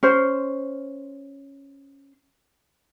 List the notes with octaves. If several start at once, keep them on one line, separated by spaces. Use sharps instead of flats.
C#4 C5